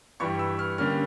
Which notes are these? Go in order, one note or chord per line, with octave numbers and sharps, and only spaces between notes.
G2 E3 G3 C#6
E6
F6
D3 G3 A#3 C#4 F6